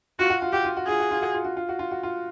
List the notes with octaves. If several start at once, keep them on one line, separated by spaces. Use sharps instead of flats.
F4 F#4
F#4
F4
F#4 G4
F4
F#4
F4 G#4
F#4
F4
F#4
F4
F#4
F4
F#4
F4
F#4
F4